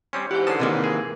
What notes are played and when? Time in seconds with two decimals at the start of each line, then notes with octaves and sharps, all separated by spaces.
0.13 G3 C4 C#4 C6
0.31 G#2 E3 G4 C5 F#5
0.47 D3 C#4 A5 D#6 C7
0.60 C3 D#3 A#3
0.84 G#4